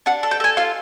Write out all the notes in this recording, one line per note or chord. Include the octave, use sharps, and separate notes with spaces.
D4 F#5
A4
G5
A4 G#5
F4 F5